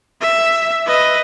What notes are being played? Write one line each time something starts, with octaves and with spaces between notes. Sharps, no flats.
E5
B4 D#5